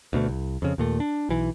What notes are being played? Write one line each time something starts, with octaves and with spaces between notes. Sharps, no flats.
D2 B2 A3
C2
F2 C#3
D#2 A#2 A3
D4
B1 E3